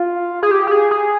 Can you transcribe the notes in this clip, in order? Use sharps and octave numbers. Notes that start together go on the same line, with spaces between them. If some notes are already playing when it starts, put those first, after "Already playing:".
Already playing: F4
G#4
G4
G4
G#4
G#4